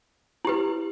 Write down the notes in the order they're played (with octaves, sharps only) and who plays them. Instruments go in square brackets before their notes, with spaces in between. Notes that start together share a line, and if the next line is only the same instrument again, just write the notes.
[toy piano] E4 G4 B4